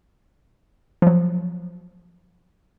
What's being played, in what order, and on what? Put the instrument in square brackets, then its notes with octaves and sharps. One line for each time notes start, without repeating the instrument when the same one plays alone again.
[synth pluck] F3 F#3